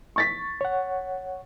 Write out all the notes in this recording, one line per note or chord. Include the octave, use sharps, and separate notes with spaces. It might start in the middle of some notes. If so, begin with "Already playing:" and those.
C#6 A6 B6
C#5 F#5